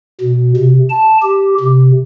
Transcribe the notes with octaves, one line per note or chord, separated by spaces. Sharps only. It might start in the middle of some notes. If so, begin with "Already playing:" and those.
B2
C3
A5
G4
C3